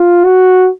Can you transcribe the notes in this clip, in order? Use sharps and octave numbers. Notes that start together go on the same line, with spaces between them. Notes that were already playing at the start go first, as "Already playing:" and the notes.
Already playing: F4
F#4